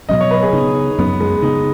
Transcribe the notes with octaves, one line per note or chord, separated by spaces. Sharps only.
B2 F#3 C#4 D#5
C#5
B4
G#4
C#3 B3 D#4
F#2 F#3 B3 C#4
G#3
C#3 B3 D#4